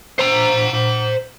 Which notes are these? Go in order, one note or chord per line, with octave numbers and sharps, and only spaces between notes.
C5 A#5